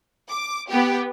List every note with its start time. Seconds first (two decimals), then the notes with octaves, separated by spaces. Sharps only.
0.30 D6
0.69 B3 G4